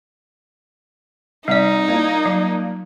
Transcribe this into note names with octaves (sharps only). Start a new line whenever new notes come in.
C3 G3 D#4 D5 F5
A#3 D4 F4
F#3